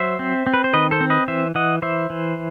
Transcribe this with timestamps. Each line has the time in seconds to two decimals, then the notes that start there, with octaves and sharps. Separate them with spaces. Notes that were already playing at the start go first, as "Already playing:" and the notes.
Already playing: F#3 C5 E5
0.19 C4
0.47 C4
0.54 B4
0.64 C5
0.73 D#3 B4 D#5
0.91 A4 C5
1.01 C4
1.10 B4 D#5
1.28 E3 C5 E5
1.55 E3 D#5 F#5
1.82 E3 C5 E5
2.10 E3